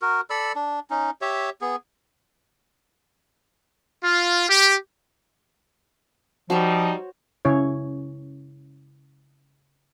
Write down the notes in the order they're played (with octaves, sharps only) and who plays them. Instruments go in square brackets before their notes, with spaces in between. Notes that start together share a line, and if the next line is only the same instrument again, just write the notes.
[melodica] F#4 A#4
A4 D5 B5 E6
D4
C#4 D#4
G4 C#5 E5
B3 G#4
[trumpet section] F4
G4
[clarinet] F3 [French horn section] G3 D#4 [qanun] F#4 C5 C#5
[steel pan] C#3 C#4 E4 C#5